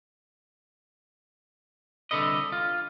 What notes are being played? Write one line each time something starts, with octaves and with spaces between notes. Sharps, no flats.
C2 D3 A4 B4 D#5
F4